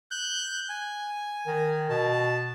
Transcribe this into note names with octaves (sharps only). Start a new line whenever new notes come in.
F#6 G6
G#5
D#3
B2 A5